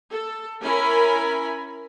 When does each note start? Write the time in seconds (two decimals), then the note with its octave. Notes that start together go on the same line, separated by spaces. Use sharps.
0.10 A4
0.62 C#4 E4 A#4 G#5 B5